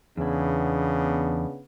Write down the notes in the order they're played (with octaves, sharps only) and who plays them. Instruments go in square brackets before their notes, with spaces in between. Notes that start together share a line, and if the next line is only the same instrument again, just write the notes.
[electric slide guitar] E2 E4 [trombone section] C#3 B3 D4